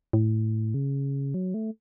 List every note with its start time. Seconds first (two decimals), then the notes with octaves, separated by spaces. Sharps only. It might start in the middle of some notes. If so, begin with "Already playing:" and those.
0.13 A2
0.74 C#3
1.34 F#3
1.54 A3